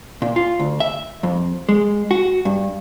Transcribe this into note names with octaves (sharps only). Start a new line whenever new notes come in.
A#2
F4
D2
E5
F2
G#3
F#4
G2